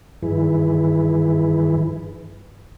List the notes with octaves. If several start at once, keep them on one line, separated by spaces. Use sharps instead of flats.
G2 D#3 E3 E4 G#4 B4